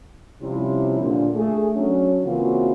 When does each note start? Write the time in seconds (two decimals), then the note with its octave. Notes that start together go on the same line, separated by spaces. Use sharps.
0.42 C3 F3 G3 C#4 E4
0.99 A#2 D3
1.36 A3 G#4
1.75 F#3 C#4 D4
2.25 C#3 E3 A#3 C4 F4 F#4